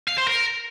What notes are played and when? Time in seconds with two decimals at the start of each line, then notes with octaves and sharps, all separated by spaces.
0.08 F5
0.17 C5
0.27 A#4